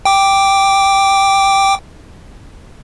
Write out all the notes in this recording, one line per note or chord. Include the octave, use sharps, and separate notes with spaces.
G5 D6